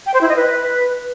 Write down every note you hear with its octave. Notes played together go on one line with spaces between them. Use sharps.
G5
C5
E4
D#5
B4